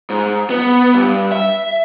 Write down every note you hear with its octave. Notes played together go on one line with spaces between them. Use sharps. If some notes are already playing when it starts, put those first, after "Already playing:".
G#2
B3
G2
E5